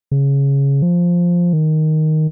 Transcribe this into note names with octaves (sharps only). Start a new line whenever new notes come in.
C#3
F3
D#3